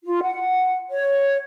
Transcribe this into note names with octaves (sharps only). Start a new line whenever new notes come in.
F4
F#5
C#5